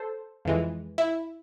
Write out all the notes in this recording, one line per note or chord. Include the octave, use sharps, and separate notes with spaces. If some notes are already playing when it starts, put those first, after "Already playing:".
Already playing: A4 C5
F2 E3 G#3
E4